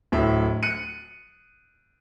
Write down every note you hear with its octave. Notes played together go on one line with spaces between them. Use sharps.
D1 A2 E5
F#6 C#7 D#7